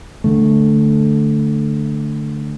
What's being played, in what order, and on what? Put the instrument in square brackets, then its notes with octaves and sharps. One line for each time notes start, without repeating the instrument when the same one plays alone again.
[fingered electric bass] D3 A3